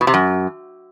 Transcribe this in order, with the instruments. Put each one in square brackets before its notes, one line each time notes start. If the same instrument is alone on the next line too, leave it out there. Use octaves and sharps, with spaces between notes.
[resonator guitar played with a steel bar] B2
C3
F#2